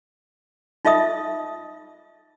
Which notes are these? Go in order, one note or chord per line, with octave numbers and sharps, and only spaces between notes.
D#4 F4 D#5 E5 D#6